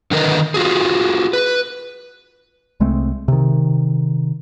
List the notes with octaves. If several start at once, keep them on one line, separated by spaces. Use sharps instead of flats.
D3 D#3 A#4 B4 D#5
F4 F#4 G#4
B4
C2 G#3 A3 C4
C3 D#3